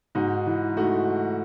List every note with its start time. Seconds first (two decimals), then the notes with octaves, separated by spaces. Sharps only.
0.15 G#2 D#4 F#4
0.46 E3
0.77 A3 D#4 F#4